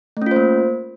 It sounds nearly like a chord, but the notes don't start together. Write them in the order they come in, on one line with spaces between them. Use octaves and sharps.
A3 C#4 F4 C5 A#3